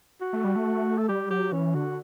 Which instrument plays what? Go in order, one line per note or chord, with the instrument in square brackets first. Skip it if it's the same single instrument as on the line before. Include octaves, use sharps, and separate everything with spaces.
[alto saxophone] F#4
[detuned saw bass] A3
G3
A3
[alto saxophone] A4
[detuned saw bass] G3 [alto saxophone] G4
[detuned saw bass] F#3 [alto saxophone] G4
[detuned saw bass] E3 [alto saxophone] C#4
[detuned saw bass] D3 [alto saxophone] F#4